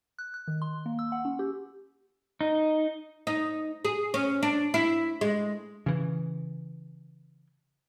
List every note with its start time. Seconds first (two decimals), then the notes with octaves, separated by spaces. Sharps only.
0.19 F#6
0.34 F#6
0.48 D#3
0.62 C6
0.86 A#3
0.99 E6
1.12 F#5
1.25 C#4
1.39 G4
2.41 D#4
3.27 D#4
3.85 G#4
4.14 C#4
4.43 D4
4.74 E4
5.21 G#3
5.86 C#3 E3